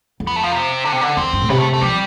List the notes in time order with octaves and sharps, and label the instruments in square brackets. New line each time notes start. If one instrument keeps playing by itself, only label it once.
[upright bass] F2
[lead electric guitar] B3
A3
F3
C3
D3
C3
D3
[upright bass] E2 [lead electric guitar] C4
[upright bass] G2
A2
[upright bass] C3 [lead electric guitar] B3
[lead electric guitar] A3
A3
[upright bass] F3 [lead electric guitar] G3